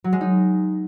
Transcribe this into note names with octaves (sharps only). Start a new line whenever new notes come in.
F#3
G#3
D#4